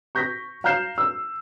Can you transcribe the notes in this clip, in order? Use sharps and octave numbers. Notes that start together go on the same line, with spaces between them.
C#6 G6 A#6 B6
F5 A#5 F6 G6 C7 E7
E6